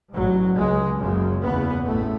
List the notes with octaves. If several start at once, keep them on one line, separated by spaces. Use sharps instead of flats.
A1 G#2 F#3
C#2 C#3 G#3
F#1 F#2 C#3 G#3
F#1 E2 C#3 B3
A1 A2 A3